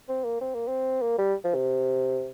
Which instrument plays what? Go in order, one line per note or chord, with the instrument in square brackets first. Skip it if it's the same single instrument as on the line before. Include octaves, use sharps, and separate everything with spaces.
[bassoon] C4
A#3
C4
A#3
C4
A#3
G3
F3
C3